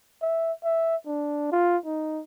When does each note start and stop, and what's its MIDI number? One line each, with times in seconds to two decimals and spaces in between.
0.22 0.53 76
0.64 0.96 76
1.07 1.47 62
1.52 1.77 65
1.85 2.22 63